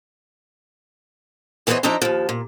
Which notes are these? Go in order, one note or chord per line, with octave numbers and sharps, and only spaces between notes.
E2 E3 B3 C5 C#5 D#5
F3 D4 D#4 D#5 E5 A#5
D#2 F3
A#2